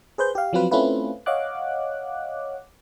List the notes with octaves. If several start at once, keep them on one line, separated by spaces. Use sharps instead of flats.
G#4 B4 C5 G6
G4 F5
F3 F#3 C4 F4 B4
A3 C4 C#4 E4 F4 B4
C#5 D#5 F5 F#5 D6 F#6